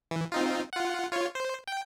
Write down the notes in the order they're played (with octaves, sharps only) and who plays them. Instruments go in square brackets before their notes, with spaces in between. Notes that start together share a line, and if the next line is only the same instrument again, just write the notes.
[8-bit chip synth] E3
C4 D#4 F4
F4 F#5
F4 C#5
C5
G5